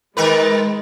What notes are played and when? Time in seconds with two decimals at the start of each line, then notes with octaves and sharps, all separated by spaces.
0.17 D#3 G#3 A#4 B4